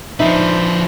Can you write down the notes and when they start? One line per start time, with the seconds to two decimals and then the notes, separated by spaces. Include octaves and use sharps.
0.20 F3 D4 D#4 B4 C5 E5